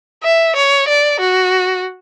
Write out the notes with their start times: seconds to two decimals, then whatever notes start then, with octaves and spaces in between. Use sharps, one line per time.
0.23 E5
0.56 C#5
0.88 D5
1.20 F#4